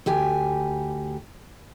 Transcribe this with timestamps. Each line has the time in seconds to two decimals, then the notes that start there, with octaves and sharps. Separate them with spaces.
0.06 D2 G4 G#5